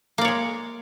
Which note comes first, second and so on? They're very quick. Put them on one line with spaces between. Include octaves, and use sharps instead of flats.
A#3 D5 C#5 G#3